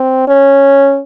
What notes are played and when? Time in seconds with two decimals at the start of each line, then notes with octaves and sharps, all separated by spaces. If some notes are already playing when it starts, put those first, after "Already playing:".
Already playing: C4
0.28 C#4